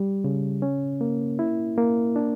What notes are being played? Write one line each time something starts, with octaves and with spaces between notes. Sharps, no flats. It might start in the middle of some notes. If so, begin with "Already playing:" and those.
Already playing: G3
C#3
C#4
A#3
E4
A#3
D4